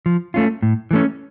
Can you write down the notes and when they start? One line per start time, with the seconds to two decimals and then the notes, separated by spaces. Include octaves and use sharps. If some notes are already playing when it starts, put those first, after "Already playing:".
0.06 F3
0.34 A3 C#4 F4
0.62 A2
0.91 E3 A3 C#4